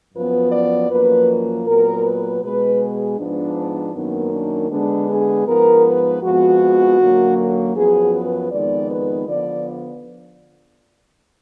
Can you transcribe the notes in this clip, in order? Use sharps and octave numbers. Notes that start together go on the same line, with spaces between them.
F#2 F3 B3 B4
D5
F#2 F3 A#3 B4
A#2 F#3 B3 A#4
B4
B2 G#3 B3 B4
G#4
G#2 F3 B3 D4
F#2 D#3 A#3 B3
D4
D3 G#3 B3 D4
G#4
G#2 F3 B3 A#4
B4
F2 F3 G#3 B3 F#4
F#2 D3 F#3 A#3
F#4
F#2 F3 B3 G#4
B4
F2 D#3 G#3 B3 D5
B4
D3 F3 B3 D5